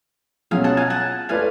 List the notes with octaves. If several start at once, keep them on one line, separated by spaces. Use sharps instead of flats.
B2 F#3 C#4 F4 G#4 F5 G#5
F#5 A5
F5 G#5
F#5 A5
A3 F4 B4 D5 F5 G#5